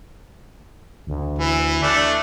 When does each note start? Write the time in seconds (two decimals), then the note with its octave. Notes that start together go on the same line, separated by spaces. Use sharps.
1.07 D2
1.39 E3
1.82 A3 D4